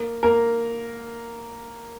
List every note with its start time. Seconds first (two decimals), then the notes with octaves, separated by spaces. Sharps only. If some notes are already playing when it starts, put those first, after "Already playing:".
Already playing: A#3 A#4
0.23 A#3 A#4